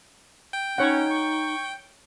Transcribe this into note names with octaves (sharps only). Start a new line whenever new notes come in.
G5
C#4 D#4 C#5 F#5
C#6